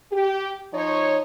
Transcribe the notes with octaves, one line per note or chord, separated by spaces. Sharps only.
G4
F3 D#4 C#5